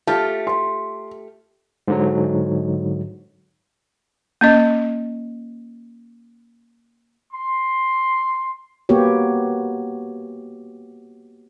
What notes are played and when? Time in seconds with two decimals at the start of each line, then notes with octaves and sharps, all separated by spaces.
0.07 A3 F4 G4 A5
0.47 C6
1.88 G#2 D3 F#3
4.41 A#3 C#4 D#5
7.33 C6
8.89 A#3 B3 F#4 G4 C#5